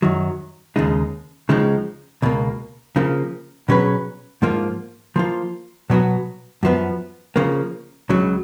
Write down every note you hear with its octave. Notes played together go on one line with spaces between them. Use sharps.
F#2 D#3 F#3
D#2 C#3 G#3 D#4
C#2 C#3 F3 G#3 D#4
C#2 B2 A#3
C#3 F3 A#3
B2 F#3 C#4 G#4 B4
G#2 F3 A#3 F4
F3 A#3 F4
B2 F#3 B3 F#4
F#2 F3 B3
C#3 F3 A#3
C#2 C#3 F#3